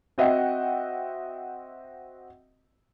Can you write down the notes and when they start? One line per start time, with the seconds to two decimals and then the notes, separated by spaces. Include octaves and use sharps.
0.18 C4 F#4 D#5 E5 F#5 G5